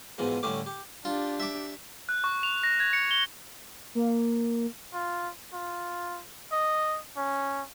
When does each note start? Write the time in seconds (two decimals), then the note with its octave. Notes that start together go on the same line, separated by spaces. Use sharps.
0.18 E2 G#2 B2 E3 F3 G#3
0.43 A2 D3 G3 A3 C#4 D6
0.66 G4
1.05 D4 F4 G4
1.40 E5 D6
2.09 F#6
2.24 C#6
2.43 F7
2.63 A#6
2.80 G#6
2.93 C#7
3.11 G7
3.95 A#3
4.93 F4
5.53 F4
6.52 D#5
7.17 C#4